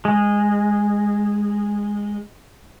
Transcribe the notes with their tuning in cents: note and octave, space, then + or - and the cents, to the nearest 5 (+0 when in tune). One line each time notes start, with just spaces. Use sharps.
G#3 -10